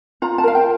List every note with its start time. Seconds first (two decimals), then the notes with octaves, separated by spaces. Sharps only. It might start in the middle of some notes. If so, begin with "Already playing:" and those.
0.22 F4 A#5
0.38 A5
0.44 A#4 F5
0.55 G5